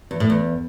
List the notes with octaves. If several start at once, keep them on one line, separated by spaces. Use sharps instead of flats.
E2
A2
E2